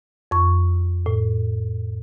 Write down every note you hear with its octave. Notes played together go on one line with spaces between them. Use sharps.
F2 C#6
A2